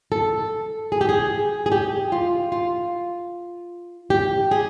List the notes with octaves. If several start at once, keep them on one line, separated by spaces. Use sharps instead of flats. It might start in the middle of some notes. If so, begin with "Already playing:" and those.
A4
G#4
G4
G#4
G#4
G4
F4
F4
G4
G#4